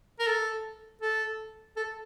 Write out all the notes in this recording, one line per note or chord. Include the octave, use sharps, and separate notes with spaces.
A#4
A4
A4
A4